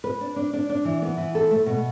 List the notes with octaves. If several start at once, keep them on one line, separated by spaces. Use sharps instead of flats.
B4
D4
D4
D4
D4
E3
B3
E3
A4
A3
B2